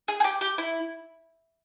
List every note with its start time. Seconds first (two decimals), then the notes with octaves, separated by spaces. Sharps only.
0.08 G#4
0.20 G#4
0.24 G4
0.41 G4
0.58 E4